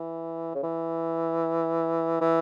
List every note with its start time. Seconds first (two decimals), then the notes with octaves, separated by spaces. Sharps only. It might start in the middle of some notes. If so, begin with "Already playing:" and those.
Already playing: E3
0.55 C#3
0.63 E3
2.21 E3